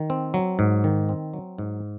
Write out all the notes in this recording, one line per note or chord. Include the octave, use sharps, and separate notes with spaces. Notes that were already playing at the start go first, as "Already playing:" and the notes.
Already playing: D#3
C4
F#3
G#2
D#3
C4
F#3
G#2